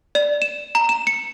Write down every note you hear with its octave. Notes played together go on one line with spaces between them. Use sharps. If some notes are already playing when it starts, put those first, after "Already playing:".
D5
E7
A#5
E7
C#7